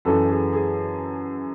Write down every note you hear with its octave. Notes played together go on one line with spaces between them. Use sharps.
F#2 E3 A4
G#4
G#4